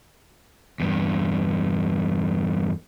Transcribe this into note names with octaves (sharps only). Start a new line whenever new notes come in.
E2 G2